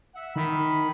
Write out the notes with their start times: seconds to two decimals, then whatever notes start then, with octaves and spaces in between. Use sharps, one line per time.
0.15 E5 F#5 E6
0.36 D#3 B5